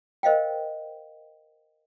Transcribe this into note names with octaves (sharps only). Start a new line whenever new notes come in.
A#4 C5 D#5 F5 G5